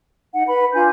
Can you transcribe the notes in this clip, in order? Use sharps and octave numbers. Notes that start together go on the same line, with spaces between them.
D#4 F#5
B4 B5
D4 F4 G#5 G6